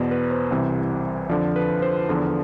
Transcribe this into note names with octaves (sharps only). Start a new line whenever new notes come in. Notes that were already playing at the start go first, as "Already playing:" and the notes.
Already playing: E2 B2 C5 D5
B4
C5
C2 C3 E3
F2 D3 F3 D5
B4
C5
E2 D3 F3